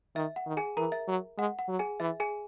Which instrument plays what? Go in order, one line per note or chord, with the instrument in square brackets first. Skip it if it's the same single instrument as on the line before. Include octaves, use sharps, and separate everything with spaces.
[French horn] D#3 [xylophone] E5
[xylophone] F#5
[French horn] D#3
[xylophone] G#4 G#5
[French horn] E3 [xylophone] A#4 A#5
[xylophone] E5
[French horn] F#3
[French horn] G#3 [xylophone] F#5
[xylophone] F#5
[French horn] F#3
[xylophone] G#4 G#5
[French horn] E3 [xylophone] E5
[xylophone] G#4 G#5